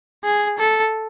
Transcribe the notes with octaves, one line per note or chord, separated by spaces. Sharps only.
G#4
A4